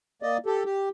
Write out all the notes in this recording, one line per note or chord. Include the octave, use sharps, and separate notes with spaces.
A#3 D5 D#5
G4 A4
G4